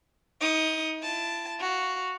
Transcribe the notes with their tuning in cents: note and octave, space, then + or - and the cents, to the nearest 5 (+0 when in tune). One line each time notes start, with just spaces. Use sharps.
D#4 +30 D#6 +0
E4 +40 A5 +0
F#4 +0 F5 +0